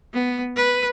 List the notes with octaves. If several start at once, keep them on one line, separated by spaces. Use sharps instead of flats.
B3
B4